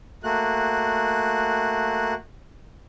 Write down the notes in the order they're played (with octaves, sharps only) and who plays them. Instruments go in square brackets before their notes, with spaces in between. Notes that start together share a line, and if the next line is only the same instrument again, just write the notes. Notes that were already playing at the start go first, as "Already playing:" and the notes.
[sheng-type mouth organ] A3 A#3 F#4 F#6